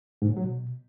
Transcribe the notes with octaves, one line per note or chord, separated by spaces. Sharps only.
G#2
A2
F#3
B2